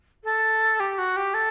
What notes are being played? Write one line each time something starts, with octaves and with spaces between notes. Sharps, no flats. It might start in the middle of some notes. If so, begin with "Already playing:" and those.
A4
G4
F#4
G4
A4